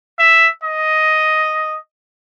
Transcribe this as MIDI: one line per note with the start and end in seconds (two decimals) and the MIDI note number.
0.19 0.48 76
0.64 1.76 75